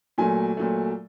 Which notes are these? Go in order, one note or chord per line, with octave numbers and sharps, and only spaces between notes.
A#2 F#3 A3 G#5
A#2 F#3 A3